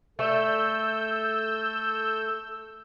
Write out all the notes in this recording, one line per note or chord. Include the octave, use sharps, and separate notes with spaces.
A3 A4 E6 G6